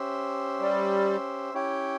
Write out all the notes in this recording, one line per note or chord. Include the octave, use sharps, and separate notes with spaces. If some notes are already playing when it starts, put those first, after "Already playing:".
Already playing: C#4 G4 C5 E5
G3
C#4 E4 G4 C#5 G5